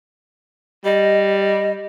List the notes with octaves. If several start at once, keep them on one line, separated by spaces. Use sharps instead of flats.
G3 D#5